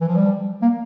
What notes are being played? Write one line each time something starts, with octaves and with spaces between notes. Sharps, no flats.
E3
F3
G3
A#3